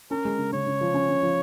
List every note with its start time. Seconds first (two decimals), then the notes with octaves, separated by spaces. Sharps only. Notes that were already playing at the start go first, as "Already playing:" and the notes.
0.11 C#4 A#4
0.25 G#3
0.39 C#3
0.53 C#3 C#5
0.66 C#3
0.81 F3
0.94 C#4
1.09 C#3
1.23 F3